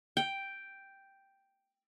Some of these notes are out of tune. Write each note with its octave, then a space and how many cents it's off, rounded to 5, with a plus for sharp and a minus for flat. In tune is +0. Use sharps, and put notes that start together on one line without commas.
G5 +0